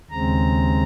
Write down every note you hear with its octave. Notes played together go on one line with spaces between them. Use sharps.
D#2 C#3 G#3 C4 A#5